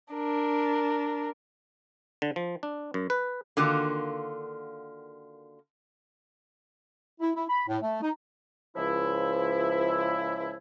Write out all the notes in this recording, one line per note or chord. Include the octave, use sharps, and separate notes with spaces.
D4 A#4
D3
F3
D4
F#2
B4
D3 D#3 A#3 F4 F#4
E4
E4
B5
A2
A3
D#4
C#2 F3 E4